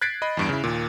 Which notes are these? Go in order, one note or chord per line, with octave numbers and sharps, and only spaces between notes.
F#6 G#6 A6 B6 C7 D7
D#5 B5
E2 G2 D7
C#3 E4
D#2 A#2